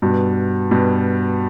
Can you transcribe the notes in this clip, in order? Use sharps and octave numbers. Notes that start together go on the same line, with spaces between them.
G2 B2
G2 B2